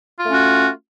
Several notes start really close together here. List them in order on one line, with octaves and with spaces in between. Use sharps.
F4 A3 C#4 F#4